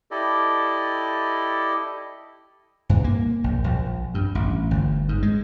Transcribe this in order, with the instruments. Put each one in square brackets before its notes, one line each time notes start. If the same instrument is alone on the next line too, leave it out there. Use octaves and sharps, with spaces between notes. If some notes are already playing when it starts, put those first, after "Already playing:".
[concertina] E4 G4 A4 D5 D#5
[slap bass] G2
A#3
A#1
A#1
G2
A1
G1
G#2
G#3